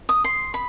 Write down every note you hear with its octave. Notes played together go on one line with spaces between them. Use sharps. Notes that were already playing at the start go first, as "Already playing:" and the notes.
D#6
C6
B5